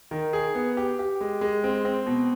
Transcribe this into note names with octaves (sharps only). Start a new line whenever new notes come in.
D#3
G#4
B3
G4
G4
G#3
G#3
C4
C4
B2